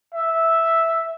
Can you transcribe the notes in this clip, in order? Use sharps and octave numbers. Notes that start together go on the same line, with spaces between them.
E5